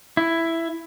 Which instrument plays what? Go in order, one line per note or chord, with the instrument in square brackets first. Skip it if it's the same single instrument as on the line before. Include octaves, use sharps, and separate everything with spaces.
[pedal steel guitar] E4